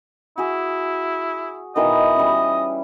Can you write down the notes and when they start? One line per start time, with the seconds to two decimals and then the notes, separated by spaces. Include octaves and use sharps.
0.38 E4 F#4 G#4
1.76 B2 D#3 E3 D#5
2.16 G3 C#4